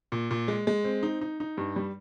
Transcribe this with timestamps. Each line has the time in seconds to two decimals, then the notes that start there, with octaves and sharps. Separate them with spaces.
0.12 A#2
0.31 A#2
0.48 G#3
0.67 G#3
0.84 C4
1.03 D#4
1.21 D#4
1.40 D#4
1.58 G2
1.76 G3